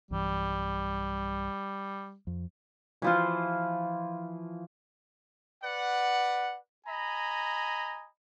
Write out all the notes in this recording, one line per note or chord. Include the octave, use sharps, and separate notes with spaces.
B1 G2 E3 G3
F2
E3 F3 F4
B4 D5 F#5
D#5 G#5 A#5 B5